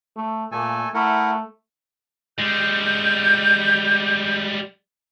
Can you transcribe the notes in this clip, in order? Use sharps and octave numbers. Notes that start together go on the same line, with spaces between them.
A3
A#2 A3 A4 G#5
A3 E4 A#4 F#5
G3 G#3 G6